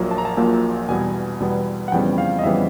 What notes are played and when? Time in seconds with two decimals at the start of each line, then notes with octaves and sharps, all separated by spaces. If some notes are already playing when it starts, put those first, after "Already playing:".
Already playing: A#1 A#2 F#3 A#3
0.11 A5
0.18 A#5
0.25 A5
0.37 A#1 A#2 F#3 A#3
0.88 E2 B2 G3 B3 G#5
1.40 E2 B2 G3 B3
1.88 F#5
1.92 F2 C#3 E3 G3 B3 G5
2.18 F5
2.39 D#5
2.44 F2 C#3 E3 G3 B3 E5